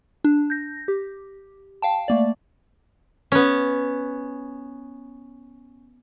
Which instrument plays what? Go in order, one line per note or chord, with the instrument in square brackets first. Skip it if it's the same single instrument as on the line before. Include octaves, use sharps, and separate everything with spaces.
[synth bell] D4
G6 A#6
G4
F5 G5 A5
A3 A#3 D5
[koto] B3 C#4